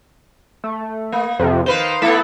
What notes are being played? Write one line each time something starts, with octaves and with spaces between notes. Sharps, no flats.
A3
A#3
F2 C3
D#3 B4 C5 F5
A3 B3 E4 A4